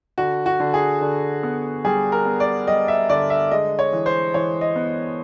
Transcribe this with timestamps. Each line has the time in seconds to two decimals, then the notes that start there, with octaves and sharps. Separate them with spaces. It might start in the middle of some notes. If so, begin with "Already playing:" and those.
0.18 D3 F#4
0.46 F#4
0.60 D3
0.74 G#4
1.01 D3
1.43 B3
1.85 G3 G#4
2.12 A#4
2.26 B3
2.40 D5
2.67 G3 D#5
2.88 E5
3.10 D3 D5
3.30 E5
3.51 G#3 D#5
3.79 C#5
3.92 E3
4.06 C5
4.34 E3 C#5
4.61 D#5
4.76 B3